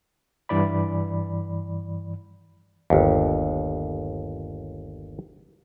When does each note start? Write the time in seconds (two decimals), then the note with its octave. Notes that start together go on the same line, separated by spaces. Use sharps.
0.49 G2 E3 D5 B5
2.90 G1 D#2